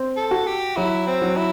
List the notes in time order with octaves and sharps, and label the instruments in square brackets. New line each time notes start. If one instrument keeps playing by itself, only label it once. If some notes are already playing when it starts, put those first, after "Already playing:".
Already playing: [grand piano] C4
[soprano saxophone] A4
[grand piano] F#4
[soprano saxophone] G4
[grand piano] F#3 [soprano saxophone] E4
[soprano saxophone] C4
[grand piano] F#3
[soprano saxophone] E4